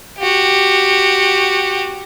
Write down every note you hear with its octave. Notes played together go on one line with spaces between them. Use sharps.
F#4 G4